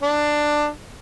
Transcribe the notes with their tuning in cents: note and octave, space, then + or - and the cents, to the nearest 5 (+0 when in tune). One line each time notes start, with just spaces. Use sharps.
D4 +10